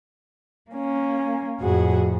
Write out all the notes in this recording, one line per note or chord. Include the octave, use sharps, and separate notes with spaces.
A#3 C#4
F2 A2 F#4 G#4 F#5